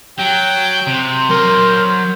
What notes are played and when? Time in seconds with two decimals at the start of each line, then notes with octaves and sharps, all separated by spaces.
0.18 F#3 G5
0.88 C3 C5
1.30 F#3 A#4 C6